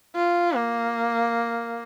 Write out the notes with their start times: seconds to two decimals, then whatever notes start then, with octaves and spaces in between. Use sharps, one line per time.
0.15 F4
0.56 A#3